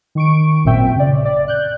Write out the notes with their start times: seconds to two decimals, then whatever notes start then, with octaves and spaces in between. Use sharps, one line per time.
0.15 D#3 C#6 D7
0.64 A1 F#2 A#2 C4 E5 G5
0.96 C#3 D5
1.25 D5
1.48 F#6 G6